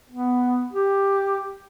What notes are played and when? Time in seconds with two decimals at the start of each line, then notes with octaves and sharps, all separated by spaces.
0.10 B3
0.72 G4